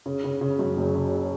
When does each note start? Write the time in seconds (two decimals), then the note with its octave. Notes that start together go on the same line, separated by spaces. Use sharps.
0.06 C#3
0.24 C#3
0.41 C#3
0.59 F#2
0.77 F#1
0.95 C#3